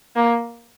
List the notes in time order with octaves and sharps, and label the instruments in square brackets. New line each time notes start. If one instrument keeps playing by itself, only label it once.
[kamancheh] A#3